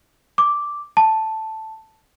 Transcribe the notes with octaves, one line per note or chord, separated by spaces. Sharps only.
D6
A5